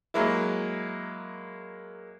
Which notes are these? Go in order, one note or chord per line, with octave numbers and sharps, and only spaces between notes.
F#3 G#3 A#3 E4